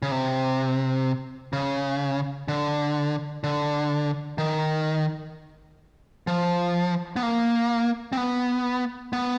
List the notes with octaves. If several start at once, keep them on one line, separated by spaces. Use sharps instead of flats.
C#3
C3
C#3
D3
D3
D#3
F3
B3
A#3
C4
B3
B3